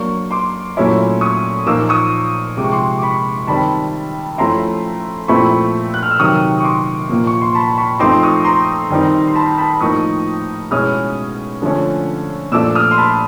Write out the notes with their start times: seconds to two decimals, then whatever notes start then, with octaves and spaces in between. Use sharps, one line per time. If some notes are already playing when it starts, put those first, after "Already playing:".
Already playing: F#3 A#3 D4 C#6
0.31 C6 D6
0.77 A#2 F#3 A3 C#4 E4
1.21 C#6 D#6
1.67 A#2 F3 A#3 D#4 D6 E6
1.89 C#6 D#6
2.57 C3 F3 G#3 D6
2.64 C#6
2.72 C6 D6
2.98 D6
3.02 B5 C#6
3.47 D#3 G3 C4 A5 B5
4.38 F3 A3 C#4 E4 A#5 C6
5.28 A#2 F3 A3 C4 E4 B5 C#6
5.94 F#6
6.03 F6
6.11 E6
6.19 C3 D#3 F#3 C#6 D#6
6.60 C#6
6.64 C6 D6
7.10 A#2 F3 A#3
7.27 C#6
7.42 C6
7.55 A5 B5
7.78 B5 C#6
8.00 F3 A3 C4 D#4 C6 D6
8.11 D6
8.23 C#6 D#6
8.45 A#5 C6
8.91 D#3 G3 C4 D#4
9.27 C6
9.35 A5 B5
9.58 A5 B5
9.81 A2 F3 A#3 D#4 C#6 D#6
10.71 B2 G#3 C#4 E4 D#6 F6
11.62 D3 F3 A3 C#4
12.52 A#2 F3 A3 D4 D6 E6
12.75 D#6 F6
12.91 C6
12.98 A5 B5